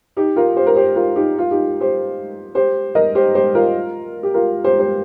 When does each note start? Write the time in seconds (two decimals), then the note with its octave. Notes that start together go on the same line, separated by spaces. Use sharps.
0.17 D#4 G4
0.36 F4 A#4
0.56 G4 C5
0.67 A#4
0.76 G4 C5
0.96 F4 A#4
1.16 D#4 G4
1.39 F4
1.51 D#4 G4
1.81 G4 C5
2.55 G4 C5
2.95 A#4 D#5
3.15 G4 C5
3.35 G4 C5
3.55 F4 A#4
4.23 G4
4.34 F4 A#4
4.64 G4 C5
4.79 G4 C5